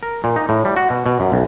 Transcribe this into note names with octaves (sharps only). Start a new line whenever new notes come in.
A#4
A#2
D#4
A2
G3
F#4
B2
B2
F#2
B1